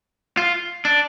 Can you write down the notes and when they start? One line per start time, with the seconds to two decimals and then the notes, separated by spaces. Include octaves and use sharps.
0.37 F4
0.85 D4